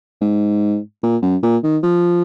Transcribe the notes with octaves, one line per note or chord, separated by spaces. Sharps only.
G#2
A#2
F#2
A#2
D#3
F3